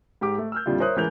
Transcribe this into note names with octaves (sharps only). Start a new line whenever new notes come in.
G#2 G4 D6
A3
E6 F6 G6
F2 A#2 D3 G3 E4 F4
A#4 C5 C#5 E5 D#6 F#6
A1 E3 G#3 A#4 G6 F7